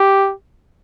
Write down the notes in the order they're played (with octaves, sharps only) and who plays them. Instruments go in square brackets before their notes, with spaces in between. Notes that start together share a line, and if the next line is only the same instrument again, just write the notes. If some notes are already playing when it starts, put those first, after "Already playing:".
Already playing: [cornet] G4